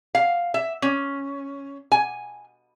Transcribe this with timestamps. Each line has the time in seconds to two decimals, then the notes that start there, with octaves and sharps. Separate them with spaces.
0.15 F5
0.54 E5
0.82 C#4
1.92 G#5